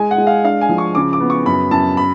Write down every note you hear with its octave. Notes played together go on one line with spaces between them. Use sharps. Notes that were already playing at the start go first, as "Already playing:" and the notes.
Already playing: G#3 G#5
F#5
G#3
F5
D4 F5
G#5
F3
C#6
C#3 D6
D6
B3
C#6
F#2 B5
F#2 A5
B5